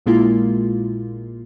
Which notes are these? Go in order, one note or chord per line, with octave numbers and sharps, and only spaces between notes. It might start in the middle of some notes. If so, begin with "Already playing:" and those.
A#1 A#2 G#3 A#3 E4 F4